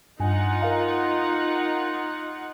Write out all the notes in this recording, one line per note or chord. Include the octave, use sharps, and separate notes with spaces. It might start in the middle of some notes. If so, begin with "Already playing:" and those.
G2 D#4 F4 F#5 G#5
A#4 F5 A#5